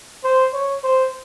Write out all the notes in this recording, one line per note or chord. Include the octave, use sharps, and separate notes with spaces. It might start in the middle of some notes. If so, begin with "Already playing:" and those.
C5
C#5
C5